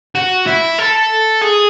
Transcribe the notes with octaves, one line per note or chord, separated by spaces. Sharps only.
F#4
E4
A4
G#4